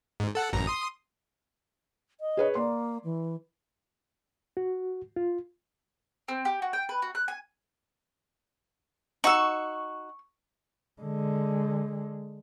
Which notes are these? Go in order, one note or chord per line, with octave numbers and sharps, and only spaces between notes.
G#2
A4 F#5
A1 F#2 A#5
C6 D#6
D#5
G#4 B4 C#5
A#3 D5 C6
E3
F#4
F4
C4
G4
F#4
G5
B4
F#4
F#6
G#5
D#4 F#4 C#6 E6
D3 G#3